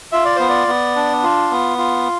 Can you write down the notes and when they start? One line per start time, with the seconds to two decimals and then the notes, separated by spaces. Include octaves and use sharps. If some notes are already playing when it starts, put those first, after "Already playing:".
0.12 F4 E5
0.25 D5
0.36 B3 C5
0.49 D5
0.68 B3
0.96 D4
1.23 F4
1.51 B3
1.78 F4